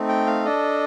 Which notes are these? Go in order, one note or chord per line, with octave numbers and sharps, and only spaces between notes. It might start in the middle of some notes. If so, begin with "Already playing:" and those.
Already playing: A3 C4 D#4
G5
F5
D4 A4 D#5